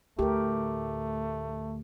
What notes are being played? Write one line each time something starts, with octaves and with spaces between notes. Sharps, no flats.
D2 A2 A3 G4 A#4